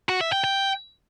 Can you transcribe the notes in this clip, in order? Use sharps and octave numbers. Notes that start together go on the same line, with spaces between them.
F#4
E5
G5
G5